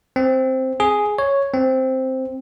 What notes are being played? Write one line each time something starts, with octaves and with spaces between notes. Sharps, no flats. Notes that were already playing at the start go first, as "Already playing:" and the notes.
C4
G#4
C#5
C4